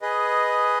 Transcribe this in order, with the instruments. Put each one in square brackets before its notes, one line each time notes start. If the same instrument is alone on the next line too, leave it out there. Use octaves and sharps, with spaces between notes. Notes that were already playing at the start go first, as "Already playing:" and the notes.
[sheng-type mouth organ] G#4 B4 D#5